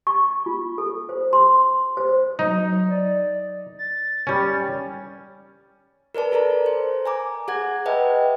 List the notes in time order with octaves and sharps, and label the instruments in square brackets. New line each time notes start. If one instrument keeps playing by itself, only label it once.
[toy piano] C#6
F4
A4
C5
C6
C5
[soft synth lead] F#3 [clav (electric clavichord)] D#4
[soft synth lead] D5
A6
[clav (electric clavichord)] G3 C#4
[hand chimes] A#4 B4 D5 A5
A4 A#4 D5 A#5
C5
G#5 A#5 D6
G#4 F#5 G#6
B4 D#5 E5 F#5 G5 A5